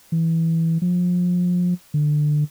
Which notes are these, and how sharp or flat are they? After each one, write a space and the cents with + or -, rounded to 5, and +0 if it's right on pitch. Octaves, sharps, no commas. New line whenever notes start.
E3 -10
F3 +30
D3 +20